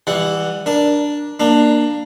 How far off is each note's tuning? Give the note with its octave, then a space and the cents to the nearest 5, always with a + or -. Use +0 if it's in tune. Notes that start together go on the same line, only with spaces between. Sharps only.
E3 -5 G3 +25 F#5 +0
D4 +0 A#4 +20
A#3 +0 D4 +15 A#5 +20